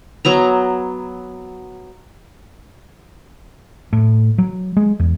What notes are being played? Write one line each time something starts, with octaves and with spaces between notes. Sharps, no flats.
F#3 B3 A#5
A2
F#3
G#3
E2